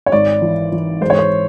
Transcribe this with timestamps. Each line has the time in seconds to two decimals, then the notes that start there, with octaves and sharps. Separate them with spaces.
0.06 C#5
0.12 G#1 D5
0.42 E3
0.72 E3
1.01 G#2 C5
1.10 C#5
1.18 C5